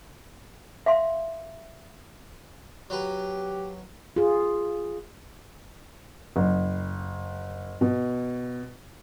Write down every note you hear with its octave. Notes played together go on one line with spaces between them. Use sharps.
E5 F5 C6
F#3 G4 B4
F4 G#4
F#1
B2